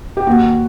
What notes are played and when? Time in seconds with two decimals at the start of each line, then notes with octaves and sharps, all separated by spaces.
0.17 G4
0.27 D#2 F#4